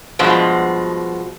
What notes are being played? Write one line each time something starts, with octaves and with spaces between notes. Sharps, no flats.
G2 B2 F3 G#3